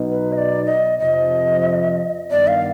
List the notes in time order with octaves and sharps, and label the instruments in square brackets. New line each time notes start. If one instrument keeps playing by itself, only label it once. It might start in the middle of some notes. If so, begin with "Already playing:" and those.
Already playing: [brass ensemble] B1 B2 B3 D#4
[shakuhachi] B4
D#5
D5
D#5
[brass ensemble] F2 C3 F3 [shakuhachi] D#5
[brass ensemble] G2 D#3 B3 [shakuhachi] D5
[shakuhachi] F5